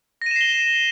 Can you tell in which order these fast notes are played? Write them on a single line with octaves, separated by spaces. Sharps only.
A#6 D#7 E7 C7 G7